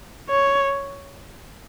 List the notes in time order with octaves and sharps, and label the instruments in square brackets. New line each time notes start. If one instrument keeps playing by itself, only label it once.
[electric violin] C#5